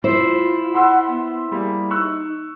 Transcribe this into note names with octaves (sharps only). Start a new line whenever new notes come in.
E4 F4 C5
F#5 B5 C6 E6
B3
G3 A#3 G#4
D#4 C#6 E6 F#6